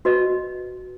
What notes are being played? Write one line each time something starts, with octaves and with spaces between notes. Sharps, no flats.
F#4 B4 D#5